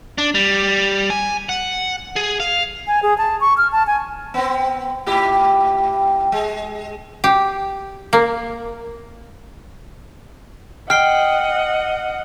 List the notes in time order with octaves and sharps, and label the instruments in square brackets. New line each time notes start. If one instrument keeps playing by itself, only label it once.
[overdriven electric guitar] D4
G3
G#5
F#5
G#4
F5
[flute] G#5
G#4
A5
C#6
F6
A5
G#5
[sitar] B3 C4
A2 E4 G4
G#3
[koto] G4
A#3
[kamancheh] D#5 F#5 [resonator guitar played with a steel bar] G5 [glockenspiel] F6 C7 G7